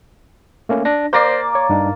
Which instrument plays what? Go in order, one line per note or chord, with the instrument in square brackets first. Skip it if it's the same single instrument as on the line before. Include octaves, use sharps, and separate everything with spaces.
[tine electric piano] A3 A#3 C#4
D4 A#6
[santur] A#3 D5 [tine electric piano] C5 A#6 C7
[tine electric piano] C#5
G2 D4 D#4